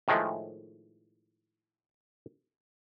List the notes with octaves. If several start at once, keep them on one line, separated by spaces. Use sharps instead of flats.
A2 D#3 F3 G#3 A3